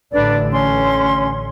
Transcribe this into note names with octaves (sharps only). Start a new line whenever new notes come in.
A1 A2 D3 D4 B4 D5
C#4 C6